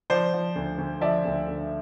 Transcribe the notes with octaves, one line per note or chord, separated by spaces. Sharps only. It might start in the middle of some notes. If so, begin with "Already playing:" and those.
F3 C5 D5
F3
D2
D2
F3 D5 E5
D2
D2